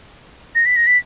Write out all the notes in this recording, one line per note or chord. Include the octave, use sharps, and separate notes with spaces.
A#6
B6
A#6
B6